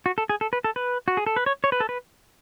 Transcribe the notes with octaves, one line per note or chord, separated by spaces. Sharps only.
F#4
A4
G#4
A4
B4
A4
B4
F#4
G#4
A4
B4
C#5
C#5
B4
A4
B4